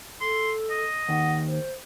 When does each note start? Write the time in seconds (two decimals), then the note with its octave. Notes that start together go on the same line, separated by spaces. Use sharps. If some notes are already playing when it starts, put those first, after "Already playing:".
0.21 A4 C6
0.70 D#5
1.09 D#2 F#5
1.47 C5